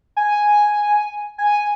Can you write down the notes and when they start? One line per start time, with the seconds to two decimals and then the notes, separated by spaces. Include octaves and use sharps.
0.17 G#5
1.38 G#5